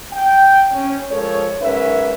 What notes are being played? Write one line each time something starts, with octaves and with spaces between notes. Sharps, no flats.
G5
C#4
F3 G#3 A4 A#4 C#5
B1 G#2 C#4 A#4 B4 E5